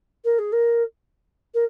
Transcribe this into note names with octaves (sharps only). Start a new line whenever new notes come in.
A#4
G#4
A#4
A#4